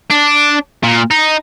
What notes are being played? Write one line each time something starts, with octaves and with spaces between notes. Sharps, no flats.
D4
A#2
D#4